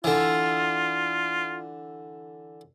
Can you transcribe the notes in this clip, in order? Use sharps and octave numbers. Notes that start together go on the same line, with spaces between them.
D3 E3 F4